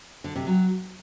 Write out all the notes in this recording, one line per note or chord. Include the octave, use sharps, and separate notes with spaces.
D3
C3
F#3